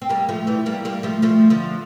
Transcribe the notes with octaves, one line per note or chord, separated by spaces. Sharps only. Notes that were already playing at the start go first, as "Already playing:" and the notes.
C4
G3 A#3
F3 A3
E3 G3
G3 A#3
G3 A#3
F3 A3
F3 A3
D3 F3